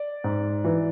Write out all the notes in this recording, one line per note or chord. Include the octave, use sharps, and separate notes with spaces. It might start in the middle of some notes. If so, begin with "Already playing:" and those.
Already playing: D5
G#2
E3